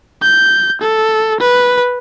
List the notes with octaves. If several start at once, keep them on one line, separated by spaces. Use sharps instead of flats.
G6
A4
B4